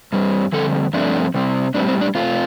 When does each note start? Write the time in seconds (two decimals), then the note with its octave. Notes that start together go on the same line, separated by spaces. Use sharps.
0.13 G2 G3 C4
0.52 F2 D3 G3 C4 A4
0.93 G2 F3 A3 C4 D4
1.34 C3 G3 C4
1.74 A2 G3 C4 D4
1.88 C4
2.01 D4
2.15 C3 A3 C4 F4